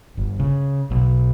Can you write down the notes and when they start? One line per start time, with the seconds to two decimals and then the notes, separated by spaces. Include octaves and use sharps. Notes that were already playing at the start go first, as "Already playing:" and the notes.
0.17 G1
0.40 C#3
0.91 B1